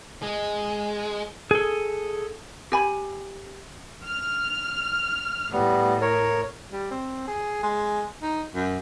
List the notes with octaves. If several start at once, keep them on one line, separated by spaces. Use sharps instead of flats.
G#3
G#4 A4
G4 G#5 B5
F6
A2 G3 B3
A#4 C#5
G3
C4
G#4
G#3
D#4
F#2